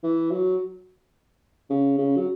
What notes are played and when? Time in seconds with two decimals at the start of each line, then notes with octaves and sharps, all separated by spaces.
0.03 E3
0.31 F#3
1.70 C#3
1.98 C#3
2.16 F#3